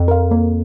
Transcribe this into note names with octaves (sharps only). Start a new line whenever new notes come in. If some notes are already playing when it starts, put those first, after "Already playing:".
Already playing: F2
A#4 F5
A#3